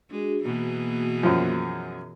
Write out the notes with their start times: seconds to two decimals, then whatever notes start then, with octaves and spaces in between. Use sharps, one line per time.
0.11 G#3 D4 F#4 G#4
0.45 B2 E3 A#3 F#4 G#4
1.23 F#2 F3